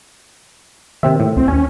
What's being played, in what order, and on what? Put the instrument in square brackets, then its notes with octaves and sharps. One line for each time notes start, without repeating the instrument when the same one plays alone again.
[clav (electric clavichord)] C3 C4 E5 [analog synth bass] D#3
[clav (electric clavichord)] A2
[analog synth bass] C#2 [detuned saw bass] C4
[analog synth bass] D#2 [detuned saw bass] C#4 [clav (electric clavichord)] G#5